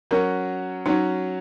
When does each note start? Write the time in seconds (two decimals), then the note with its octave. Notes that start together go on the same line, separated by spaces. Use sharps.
0.11 F#3 C#4 F#4 A#4
0.86 F#3 C#4 D#4 F#4